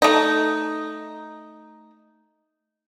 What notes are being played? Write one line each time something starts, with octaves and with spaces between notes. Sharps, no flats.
A3 D#4